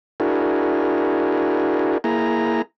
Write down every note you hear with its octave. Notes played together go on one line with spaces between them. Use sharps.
D4 E4 F#4 G#4 A#4
A#3 E4 G#4 A#5